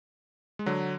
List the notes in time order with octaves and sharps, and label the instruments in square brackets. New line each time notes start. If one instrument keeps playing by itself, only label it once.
[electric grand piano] G#3
D3 F#3